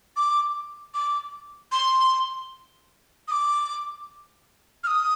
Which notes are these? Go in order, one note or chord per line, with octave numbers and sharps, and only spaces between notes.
D6
D6
C6
D#6
D6
F6
D#6